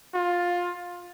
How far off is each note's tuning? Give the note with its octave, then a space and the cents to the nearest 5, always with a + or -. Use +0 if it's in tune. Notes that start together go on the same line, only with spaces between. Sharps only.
F4 +15